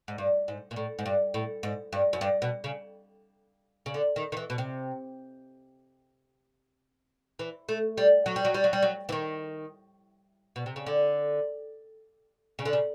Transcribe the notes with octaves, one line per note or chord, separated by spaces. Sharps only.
G#2
G2
G#2
A#2
A2
G#2
G2
A2
G#2
G2
F#2
G2
B2
C#3
C#3
D3
D#3
D#3
E3
B2
C3
E3
A3
G3
F#3
G3
F#3
G3
F#3
G3
F#3
E3
D#3
B2
C3
C#3
D3
C#3
D3
C#3